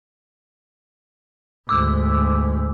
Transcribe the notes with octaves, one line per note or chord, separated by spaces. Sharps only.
D2 G#2 D6 E6